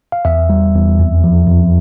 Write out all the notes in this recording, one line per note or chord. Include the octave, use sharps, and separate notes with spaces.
F5
E2 E5
G3
E2
F2
F3
F2